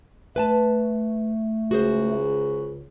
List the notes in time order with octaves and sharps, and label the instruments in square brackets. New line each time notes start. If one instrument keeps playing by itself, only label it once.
[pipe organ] A3 [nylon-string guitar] B4 G#5 A5
[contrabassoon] C#2 [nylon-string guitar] F#4 G#4 C5